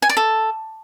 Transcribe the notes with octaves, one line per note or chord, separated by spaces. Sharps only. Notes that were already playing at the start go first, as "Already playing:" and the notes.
G#5
D5
A4